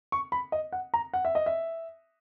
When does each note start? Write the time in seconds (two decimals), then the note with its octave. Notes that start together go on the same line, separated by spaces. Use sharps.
0.12 C#6
0.32 B5
0.52 D#5
0.72 F#5
0.94 A#5
1.14 F#5
1.25 E5
1.35 D#5
1.46 E5